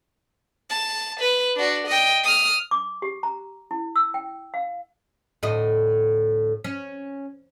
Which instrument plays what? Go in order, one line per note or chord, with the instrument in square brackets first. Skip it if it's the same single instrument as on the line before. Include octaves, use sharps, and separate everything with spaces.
[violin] A5
B4
D4 F#4
D#5 G5
D#6 F6
[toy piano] D6
G4
A#5
E4
E6
G5
F5
[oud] D2 A2 D#5
C#4